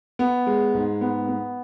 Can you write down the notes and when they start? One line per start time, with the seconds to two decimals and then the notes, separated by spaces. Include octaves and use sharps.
0.19 B3
0.47 G#3
0.74 G#2
1.01 B3
1.28 B3